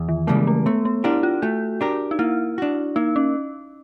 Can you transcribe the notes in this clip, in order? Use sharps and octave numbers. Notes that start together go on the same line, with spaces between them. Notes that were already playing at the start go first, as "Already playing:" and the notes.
Already playing: E2
D#3
C#3 E3 G3 G#3 A#3
A3
A3 B3
B3
D4 E4 G4 A#4
F4
A3 F#4
D4 G4 A#4
D#4
A#3 E4
D4 F#4
A#3 D#4
C#4